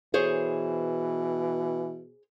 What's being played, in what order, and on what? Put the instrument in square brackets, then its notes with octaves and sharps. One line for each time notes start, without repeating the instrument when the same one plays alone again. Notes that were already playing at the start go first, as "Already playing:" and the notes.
[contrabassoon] B2 [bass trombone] E3 [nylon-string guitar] G#4 C5 C#5